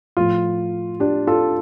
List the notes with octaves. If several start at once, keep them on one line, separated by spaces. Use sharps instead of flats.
A2 F3 F4
D4 G4
F4 A4